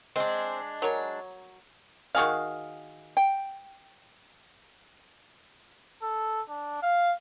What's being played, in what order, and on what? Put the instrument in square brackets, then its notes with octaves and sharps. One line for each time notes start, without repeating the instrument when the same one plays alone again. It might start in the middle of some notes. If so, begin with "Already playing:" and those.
[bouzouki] G#3 D4 [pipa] C4
[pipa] F#3 A#4 C#5
D#3 F#4 G#4 F5
G5
[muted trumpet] A4
D4
F5